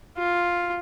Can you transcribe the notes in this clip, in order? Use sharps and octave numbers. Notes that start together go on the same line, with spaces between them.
F4